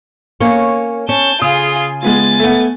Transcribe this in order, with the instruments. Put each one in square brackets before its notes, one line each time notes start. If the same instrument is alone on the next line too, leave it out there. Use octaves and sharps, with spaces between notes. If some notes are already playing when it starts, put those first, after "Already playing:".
[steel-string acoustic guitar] A#3 C#4 C#5
[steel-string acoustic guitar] C#4 [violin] A5 G6
[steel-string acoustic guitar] C#3 [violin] F4 G#4 [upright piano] D#6
[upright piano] G#3 B3 F4 [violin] G#5 A6
[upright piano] A3 B3